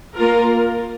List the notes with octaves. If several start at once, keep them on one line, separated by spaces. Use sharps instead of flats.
A#3 F4 A#4